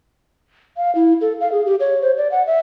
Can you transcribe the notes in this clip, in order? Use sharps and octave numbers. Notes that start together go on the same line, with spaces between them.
F5
E4
A4
F5
G#4
G4
C#5
C5
D5
F#5
E5